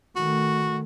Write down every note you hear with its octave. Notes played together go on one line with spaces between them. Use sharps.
D#3 A3 F#4